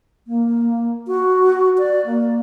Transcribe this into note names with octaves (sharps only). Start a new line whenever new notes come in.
A#3
F#4
D5
A#3